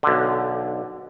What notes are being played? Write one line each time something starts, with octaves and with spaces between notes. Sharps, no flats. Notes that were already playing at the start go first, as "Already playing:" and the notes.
B1 D3